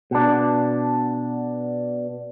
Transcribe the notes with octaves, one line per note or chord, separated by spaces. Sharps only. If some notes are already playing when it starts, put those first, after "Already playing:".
B2 D4